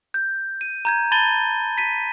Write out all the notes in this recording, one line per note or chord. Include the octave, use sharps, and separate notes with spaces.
G6
D#7
A#5 G6 G#6
A5 B5 G#6 A6 D#7 G7
B6 D#7